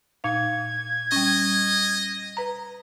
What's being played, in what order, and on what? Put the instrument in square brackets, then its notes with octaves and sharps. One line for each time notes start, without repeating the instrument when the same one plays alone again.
[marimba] A#2 D#4 F5 [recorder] G#6
[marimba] G3 C#4 [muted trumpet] D#5
[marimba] B4 A#5